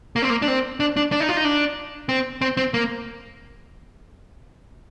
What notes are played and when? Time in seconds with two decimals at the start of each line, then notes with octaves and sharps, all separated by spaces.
0.16 A#3
0.22 C4
0.30 A#3
0.42 D4
0.48 C4
0.80 D4
0.97 D4
1.12 D4
1.20 D#4
1.29 F4
1.37 D#4
1.45 D4
2.09 C4
2.41 C4
2.57 C4
2.74 A#3